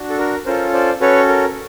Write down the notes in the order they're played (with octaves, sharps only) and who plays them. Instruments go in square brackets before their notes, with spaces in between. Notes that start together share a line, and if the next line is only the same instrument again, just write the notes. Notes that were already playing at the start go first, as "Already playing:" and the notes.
Already playing: [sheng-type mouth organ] D4 F#4
A4
A#4
C#4 F4 A4 A#4 C5
C5 D5
C#4 F#4 A4 B4 C#5
A#4